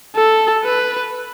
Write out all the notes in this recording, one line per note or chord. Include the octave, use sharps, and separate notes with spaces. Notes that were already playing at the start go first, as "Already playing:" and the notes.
A4
B4